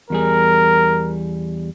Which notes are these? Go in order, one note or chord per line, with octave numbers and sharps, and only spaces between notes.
E2 G3 G#4 A#4